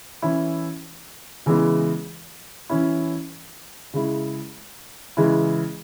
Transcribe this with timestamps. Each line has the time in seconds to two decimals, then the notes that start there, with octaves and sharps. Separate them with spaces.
0.22 E3 C#4 E4
1.46 C#3 E3 G#3 B3 E4
2.70 E3 C#4 E4
3.94 C#3 G#3 E4
5.17 C#3 E3 G#3 E4